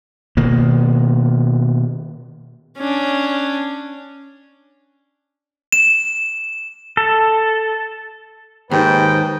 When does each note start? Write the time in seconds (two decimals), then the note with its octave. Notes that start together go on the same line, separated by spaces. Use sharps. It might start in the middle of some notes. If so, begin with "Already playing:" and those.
0.37 B2 D#3 A#3
2.78 C#4 D4
5.72 E7
6.97 A4
8.71 D#2 G#2 D#4 B4 C5 G5